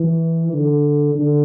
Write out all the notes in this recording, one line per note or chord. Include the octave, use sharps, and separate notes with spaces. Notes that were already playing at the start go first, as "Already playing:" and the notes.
Already playing: E3
D3
D3